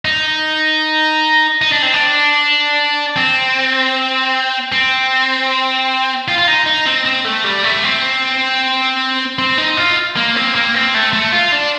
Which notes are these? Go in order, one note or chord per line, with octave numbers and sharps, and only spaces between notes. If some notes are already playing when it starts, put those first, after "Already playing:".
D#4
D#4
D4
C4
D4
C4
C4
F4
F4
D#4
D#4
C4
C4
A3
G3
A3
C4
C4
D#4
F4
A#3
C4
A#3
C4
A3
A3
F4
D4